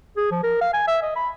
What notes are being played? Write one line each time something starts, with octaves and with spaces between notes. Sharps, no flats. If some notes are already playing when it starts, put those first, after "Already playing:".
G#4
F3
A#4
F5
G#5
E5
D#5
B5